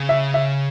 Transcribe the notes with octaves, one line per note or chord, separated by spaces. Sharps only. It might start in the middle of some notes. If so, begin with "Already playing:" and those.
Already playing: C#3
E5
E5